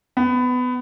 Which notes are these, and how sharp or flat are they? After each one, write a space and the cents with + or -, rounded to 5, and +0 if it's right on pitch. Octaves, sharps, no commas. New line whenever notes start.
B3 +20